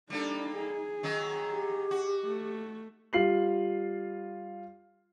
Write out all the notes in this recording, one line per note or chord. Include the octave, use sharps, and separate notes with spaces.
G3 A#3 D4 D#4 A4
G#4
D#3 F#3 D#4
G4
F#4
A3
G3 F4 C7 F#7